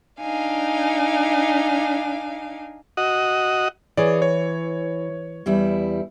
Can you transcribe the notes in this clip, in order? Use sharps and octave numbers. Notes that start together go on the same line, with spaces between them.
D4 D#4 F5 G#5
F#4 D#5
E3 G#4 C#5 D5
C#5
E2 G3 E4